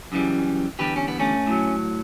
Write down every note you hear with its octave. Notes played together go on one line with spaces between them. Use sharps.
F#2 C#3 E3 G3
E2 D3 G3 G4 B4
C#4
B3
A3 C#4
A2 F#3